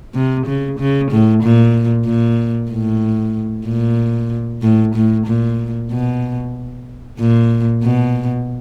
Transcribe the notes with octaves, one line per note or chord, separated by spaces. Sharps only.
C3
C#3
C#3
A2
A#2
A#2
A2
A#2
A2
A2
A#2
B2
A#2
B2